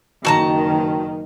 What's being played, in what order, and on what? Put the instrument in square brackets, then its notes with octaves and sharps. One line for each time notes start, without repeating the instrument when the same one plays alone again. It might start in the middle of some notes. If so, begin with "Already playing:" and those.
[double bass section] F#1 D#3 [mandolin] F#4 A5 A#5